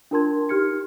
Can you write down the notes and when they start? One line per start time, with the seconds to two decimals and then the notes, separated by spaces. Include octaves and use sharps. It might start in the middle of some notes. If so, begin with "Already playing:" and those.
0.11 D4 F4 A#4 A5 C6 G#6
0.49 D#4 G4 F6 G#6 C#7